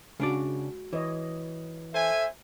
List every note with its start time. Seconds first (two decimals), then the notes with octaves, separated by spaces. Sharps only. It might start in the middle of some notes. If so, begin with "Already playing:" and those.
0.20 C#3 G#3 D4 F#4 D5
0.93 E3 C#5 D#5
1.94 A4 C5 E5 G#5